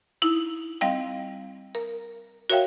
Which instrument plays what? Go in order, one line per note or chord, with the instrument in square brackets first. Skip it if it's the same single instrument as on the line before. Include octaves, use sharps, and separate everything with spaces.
[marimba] D#4 E4
G3 C4 D#5 F5 G5
A#4
F#4 A#4 C#5 E5 F5 G5